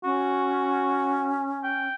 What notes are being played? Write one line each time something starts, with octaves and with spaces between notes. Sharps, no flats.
C#4 F#4
G5